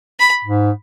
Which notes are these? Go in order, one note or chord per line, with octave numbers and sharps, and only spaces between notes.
B5
G#2